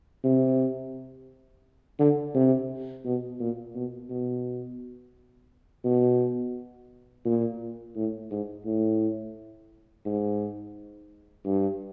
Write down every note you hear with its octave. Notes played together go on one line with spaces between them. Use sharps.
C3
D3
C3
B2
A#2
B2
B2
B2
A#2
A2
G#2
A2
G#2
G2